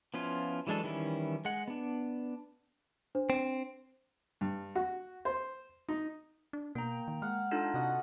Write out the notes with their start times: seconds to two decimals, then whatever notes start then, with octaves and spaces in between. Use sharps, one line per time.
0.14 F3 B3 C#4 E4 F4
0.67 E3 F#3 G#3 D4 A4
0.84 D#3 E3 G3 C#4 E4
1.45 G#3 F#5
1.68 B3 D4
3.15 D4 C5
3.30 C4
4.41 G2
4.75 F#4
5.25 C5
5.89 D#4
6.53 D4
6.75 B2 A#3 G5 A#5
7.08 D#3
7.22 G#3 F5 F#5
7.51 D4 D#4 F4 A4 E6
7.74 C3 F#4 D#5 F#5